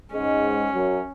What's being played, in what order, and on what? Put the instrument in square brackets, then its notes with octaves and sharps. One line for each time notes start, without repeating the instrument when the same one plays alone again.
[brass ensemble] G#2 G#3 [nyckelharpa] C#4
[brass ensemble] F#2 F#3